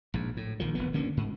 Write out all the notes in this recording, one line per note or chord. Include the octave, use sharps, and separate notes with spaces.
A#1 G#2
A2
A#1 D#3 F3
E1 E3 B3
D2 D3 A#3 C#4
G#2